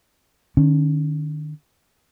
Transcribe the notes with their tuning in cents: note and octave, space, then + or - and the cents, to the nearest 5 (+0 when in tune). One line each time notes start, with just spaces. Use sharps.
D#3 -40 C#4 +0